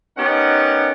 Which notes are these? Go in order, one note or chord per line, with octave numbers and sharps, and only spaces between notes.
B3 C#4 D#4 G4 A#4 F#5